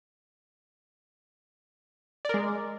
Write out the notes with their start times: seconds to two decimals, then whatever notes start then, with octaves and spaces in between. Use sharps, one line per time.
2.25 D5
2.29 A#4
2.34 G#3